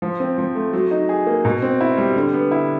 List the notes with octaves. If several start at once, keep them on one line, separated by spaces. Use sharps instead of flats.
F3
C4
F3
A3
F#3
D#4
G#4
A#3
B2
C4
E4
G3
D3
B3
E4